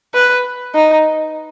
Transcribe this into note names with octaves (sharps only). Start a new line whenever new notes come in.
B4
D#4